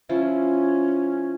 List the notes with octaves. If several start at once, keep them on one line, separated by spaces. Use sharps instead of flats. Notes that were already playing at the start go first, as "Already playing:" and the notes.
F3 C#4 E4 F4